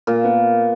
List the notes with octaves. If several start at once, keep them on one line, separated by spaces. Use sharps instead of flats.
A#2 A#3
B3